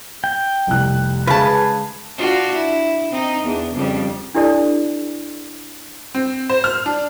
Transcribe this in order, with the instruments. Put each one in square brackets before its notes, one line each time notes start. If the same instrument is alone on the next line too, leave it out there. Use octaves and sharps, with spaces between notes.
[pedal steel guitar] G5
[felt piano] F1 C2 F#6
[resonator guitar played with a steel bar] C#3 A5 [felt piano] G#3 [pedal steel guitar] G#4 B4
[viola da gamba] D4 F4 F#4
E4
C4 D#4
E2 D4
F2 C#3 G3
[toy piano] D4 E4 G4 A4 D5 A5
[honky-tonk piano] C4
C5
F6
D4